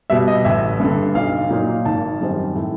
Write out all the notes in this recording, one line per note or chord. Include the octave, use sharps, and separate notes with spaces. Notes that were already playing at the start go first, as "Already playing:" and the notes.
B2 G3 E5
D#5
A1 E5
G2 D3
B1 F5
A#2 F#3 A#3 D#4
G#1 A5
F#2 D#3 G3 C4
A2